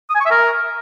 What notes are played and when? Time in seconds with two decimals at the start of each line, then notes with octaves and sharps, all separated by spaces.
0.10 D#6
0.15 G#5
0.20 C#6
0.25 E5
0.31 A#4